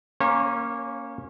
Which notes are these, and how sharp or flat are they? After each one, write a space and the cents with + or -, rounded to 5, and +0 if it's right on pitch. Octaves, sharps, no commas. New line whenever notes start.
A#3 +0 C#4 +0 C#5 -40